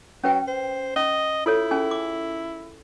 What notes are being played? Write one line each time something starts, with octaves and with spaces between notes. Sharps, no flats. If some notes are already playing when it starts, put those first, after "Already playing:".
F#3 C#4 B4 G5
C5
C#4 D#5
E4 F4 A4 C#5
C#4 G#4 G#5
D6